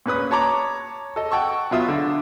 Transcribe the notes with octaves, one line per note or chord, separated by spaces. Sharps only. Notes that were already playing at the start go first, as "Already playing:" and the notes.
A#2 C#4 B4 D#6
C#5 A5 A#5 D6
A4 D#5
F#5 G5 A5 C#6 E6
B2 F#3 F4 E5 D#6
D3